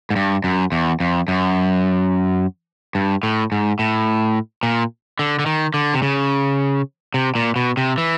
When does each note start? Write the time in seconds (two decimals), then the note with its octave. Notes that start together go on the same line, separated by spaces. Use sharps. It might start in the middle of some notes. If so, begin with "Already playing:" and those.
0.10 G#2
0.16 G2
0.44 F#2
0.72 E2
1.00 F2
1.28 F#2
2.95 G2
3.23 A2
3.52 G#2
3.79 A2
4.63 A#2
5.19 D3
5.39 D3
5.46 D#3
5.74 D3
5.94 C3
6.02 C#3
7.14 C3
7.35 A#2
7.56 B2
7.77 C3
7.98 E3